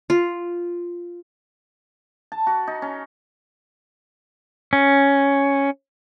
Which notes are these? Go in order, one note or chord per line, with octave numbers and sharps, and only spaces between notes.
F4
A5
F#4
D#4
C#4
C#4